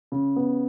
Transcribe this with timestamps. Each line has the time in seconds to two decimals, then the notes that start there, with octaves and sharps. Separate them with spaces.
0.12 C#3
0.36 B3